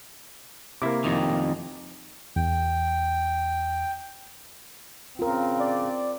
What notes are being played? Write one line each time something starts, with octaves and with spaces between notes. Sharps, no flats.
C3 A#3 E4 D6
F2 D#3
E2 G5
C#3 C4 F4 A#4
D5